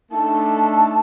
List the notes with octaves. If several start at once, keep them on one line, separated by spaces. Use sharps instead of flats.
A3 D4 D#4 A5